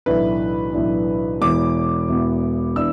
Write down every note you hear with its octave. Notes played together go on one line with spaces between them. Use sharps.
B1 A2 E3 D4 B4
B1 A2 E3 D4
E1 E2 E3 B3 D6
E1 E2 E3 B3
E3 B3 D4 E6